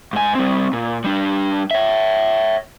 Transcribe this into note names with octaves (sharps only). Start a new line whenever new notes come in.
G#2 G#5
G3 C4
A#2
G3 D4
C#5 E5